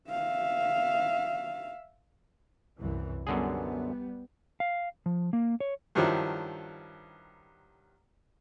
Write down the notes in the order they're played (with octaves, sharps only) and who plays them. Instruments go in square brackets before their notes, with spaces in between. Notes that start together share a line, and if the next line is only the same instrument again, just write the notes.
[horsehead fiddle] E5 F5
[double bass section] C2 F#2 E3
[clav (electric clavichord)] F#2 D3 G#4 [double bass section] G3 B3
[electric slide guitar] F5
F3
A#3
C#5
[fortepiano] G2 D#3 F3 F#3 E4